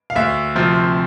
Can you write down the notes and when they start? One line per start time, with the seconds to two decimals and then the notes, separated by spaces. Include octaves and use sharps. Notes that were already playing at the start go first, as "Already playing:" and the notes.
0.10 F5
0.15 D2 E5
0.56 C3 F3 C4